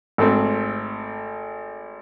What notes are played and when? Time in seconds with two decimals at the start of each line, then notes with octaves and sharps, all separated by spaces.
0.18 G#1 A3 C4